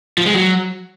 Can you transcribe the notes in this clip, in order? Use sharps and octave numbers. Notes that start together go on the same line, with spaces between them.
F3
G#3
F#3